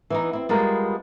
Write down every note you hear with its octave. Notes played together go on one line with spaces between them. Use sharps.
E3 B3 D#4
C4 E4
G3 G#3 B3 F4 A#4